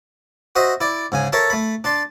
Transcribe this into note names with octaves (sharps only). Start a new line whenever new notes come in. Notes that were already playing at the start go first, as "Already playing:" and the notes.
F#4 C5 D#5 E5
E4 D5
G#2 C#3 G#5
A4 A#4 C#5 E5 A5
A3 B5
D4 A5 C6